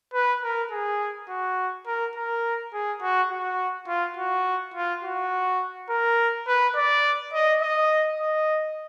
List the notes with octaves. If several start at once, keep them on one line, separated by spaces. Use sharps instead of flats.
B4
A#4
G#4
F#4
A#4
A#4
G#4
F#4
F#4
F4
F#4
F4
F#4
A#4
B4
D5
D#5
D#5
D#5